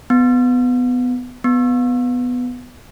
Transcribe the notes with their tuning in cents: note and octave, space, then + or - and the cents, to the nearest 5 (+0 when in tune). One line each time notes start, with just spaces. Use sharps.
B3 +15
B3 +10